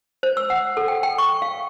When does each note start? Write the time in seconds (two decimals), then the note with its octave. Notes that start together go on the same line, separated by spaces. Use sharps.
0.23 C5
0.37 E6
0.50 F#5
0.77 A4
0.88 G5
1.03 G5
1.18 C#6
1.42 F5